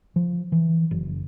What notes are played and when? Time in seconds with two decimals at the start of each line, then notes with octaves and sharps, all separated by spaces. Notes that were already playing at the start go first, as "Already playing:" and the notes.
0.16 F3
0.52 E3
0.91 F#1